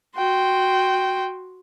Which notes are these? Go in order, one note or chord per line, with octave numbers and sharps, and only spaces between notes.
F#4 G5 C6